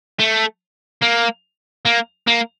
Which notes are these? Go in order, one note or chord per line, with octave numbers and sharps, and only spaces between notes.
A3
A#3
A#3
A#3